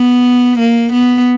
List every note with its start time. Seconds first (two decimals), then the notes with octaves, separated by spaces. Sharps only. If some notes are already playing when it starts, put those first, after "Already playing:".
Already playing: B3
0.59 A#3
0.93 B3